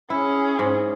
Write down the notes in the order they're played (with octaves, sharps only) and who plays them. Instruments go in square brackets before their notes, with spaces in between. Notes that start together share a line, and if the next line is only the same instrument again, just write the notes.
[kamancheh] C#4 G#4 [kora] E4
[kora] G#2